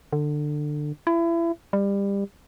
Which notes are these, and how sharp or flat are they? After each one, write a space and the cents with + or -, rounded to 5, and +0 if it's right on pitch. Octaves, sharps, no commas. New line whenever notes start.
D3 +20
E4 +30
G3 +25